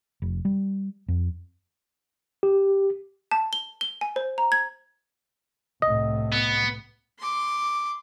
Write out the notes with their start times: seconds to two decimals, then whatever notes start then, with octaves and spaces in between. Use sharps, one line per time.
0.22 F1
0.45 G3
1.08 F2
2.43 G4
3.31 A5
3.53 G7
3.81 G7
4.01 G#5
4.16 C5
4.38 A#5
4.52 G#6
5.82 C2 A2 D#5
6.32 B3
7.19 C6 D6